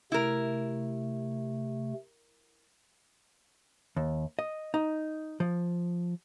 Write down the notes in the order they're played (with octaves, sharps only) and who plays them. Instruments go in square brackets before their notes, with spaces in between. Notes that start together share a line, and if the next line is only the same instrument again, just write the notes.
[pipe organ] C3 A3 [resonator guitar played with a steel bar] E4 A#4
[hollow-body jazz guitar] D#2
D#5
D#4
F3